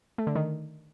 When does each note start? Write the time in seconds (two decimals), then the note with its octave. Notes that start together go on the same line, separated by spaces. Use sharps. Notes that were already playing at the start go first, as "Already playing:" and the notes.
0.18 A3
0.27 D3
0.36 D#3